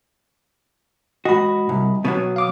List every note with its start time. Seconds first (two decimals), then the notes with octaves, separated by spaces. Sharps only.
1.25 G#2 F#4 D#5 B5
1.69 C2
2.05 B2 D#3 F#3
2.36 F5 D6 D#6